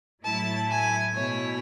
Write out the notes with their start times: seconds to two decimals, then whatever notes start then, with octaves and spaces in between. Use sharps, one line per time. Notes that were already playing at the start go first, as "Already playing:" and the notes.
0.24 A2 F#3 A3 E4 A5
0.70 G#5
1.16 B2 A3 E4 C#5